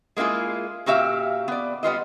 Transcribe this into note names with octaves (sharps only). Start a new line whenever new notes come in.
G#3 A#3 E4 F4 G#4
A#2 F#4 G4 E5 F5
B3 D5
G3 B3 F4 D#5